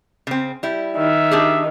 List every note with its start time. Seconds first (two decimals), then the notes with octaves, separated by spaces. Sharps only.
0.27 C#3 C4
0.63 G3 E4
0.96 D#3 E5
1.31 D4 G4 G#4